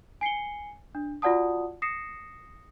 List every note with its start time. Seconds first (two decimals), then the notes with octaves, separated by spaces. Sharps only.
0.21 G#5 C7 C#7 G7
0.95 D4
1.22 F4 F#4 D5 F#5 A5 D#6
1.82 D#6 A#6 C7 C#7 E7